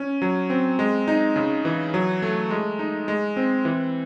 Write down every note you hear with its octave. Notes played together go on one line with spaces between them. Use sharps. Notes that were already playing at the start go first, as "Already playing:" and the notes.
Already playing: C#4
F#3
C4
G#3
D#4
C#3
E3
F#3
A3
G#3
D#4
G#3
C4
E3